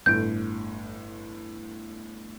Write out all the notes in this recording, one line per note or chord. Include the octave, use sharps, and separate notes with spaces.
G1 A2 G6 D7